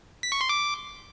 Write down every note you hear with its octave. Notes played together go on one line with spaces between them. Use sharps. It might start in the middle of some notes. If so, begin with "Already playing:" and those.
B6
C#6
C6
D6